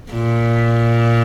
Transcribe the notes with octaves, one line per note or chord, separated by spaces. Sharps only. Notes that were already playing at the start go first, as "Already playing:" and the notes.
A#2